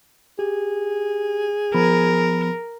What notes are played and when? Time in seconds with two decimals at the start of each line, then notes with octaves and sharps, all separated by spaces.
0.39 G4 G#4
1.75 F3 B3 A#4 B5